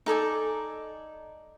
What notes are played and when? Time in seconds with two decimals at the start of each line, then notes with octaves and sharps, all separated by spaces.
0.06 D#4 A4 D5 G#5